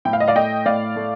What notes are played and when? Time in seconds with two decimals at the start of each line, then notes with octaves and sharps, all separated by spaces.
0.05 A2 G5
0.13 F5
0.20 D#5
0.28 D5 F5
0.36 A3 D#5 G5
0.66 A2 D5 F5
0.96 A3